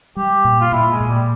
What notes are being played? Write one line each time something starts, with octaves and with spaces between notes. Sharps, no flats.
G3 G4
A#2
F4
A#2 E4
G#3
A#2
G3